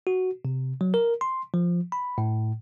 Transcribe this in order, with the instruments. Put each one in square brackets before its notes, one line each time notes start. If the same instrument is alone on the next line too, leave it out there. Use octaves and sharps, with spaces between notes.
[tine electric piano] F#4
C3
F#3
A#4
C6
F3
B5
A2